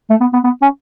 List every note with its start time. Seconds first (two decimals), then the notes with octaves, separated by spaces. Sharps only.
0.10 A3
0.20 B3
0.33 B3
0.44 B3
0.62 C#4